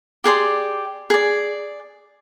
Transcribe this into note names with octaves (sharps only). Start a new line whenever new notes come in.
G4 G#4 D5 C6
G#4 D5